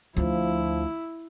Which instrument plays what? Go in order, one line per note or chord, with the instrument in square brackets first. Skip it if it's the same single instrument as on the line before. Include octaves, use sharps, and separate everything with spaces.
[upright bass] D2 [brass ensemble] F3 [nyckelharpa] E4